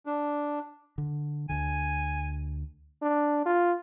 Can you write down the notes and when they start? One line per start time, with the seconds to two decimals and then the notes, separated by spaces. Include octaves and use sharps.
0.06 D4
0.98 D3
1.49 D2 D3 G#5
3.02 D4
3.46 F4